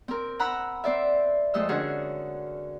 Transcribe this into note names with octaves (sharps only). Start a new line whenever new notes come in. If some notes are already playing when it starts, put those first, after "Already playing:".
C4 A#4
F#5 A#5 B5 E6 F#6
C4 C5 D5 E5
F2 G#3 A3 D#5 E6
D3 C#4 F#4 G#4 A#4